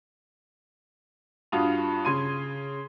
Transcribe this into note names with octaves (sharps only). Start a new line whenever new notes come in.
G2 F4 F#4 D#6 F7
C#3 C6 G#6 D#7